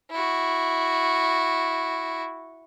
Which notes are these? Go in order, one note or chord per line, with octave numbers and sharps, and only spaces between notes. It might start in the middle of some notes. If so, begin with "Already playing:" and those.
E4 F#4